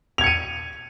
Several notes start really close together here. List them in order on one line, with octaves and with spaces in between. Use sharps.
F7 G#6 C#7 D#7